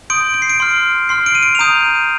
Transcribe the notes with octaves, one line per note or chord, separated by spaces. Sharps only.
C6 D#6 G6 D7
D7
C7
D7
C6 F6
C6 F6 C7
D7
D#7
D7
F7
A#5 D#6 G6 D#7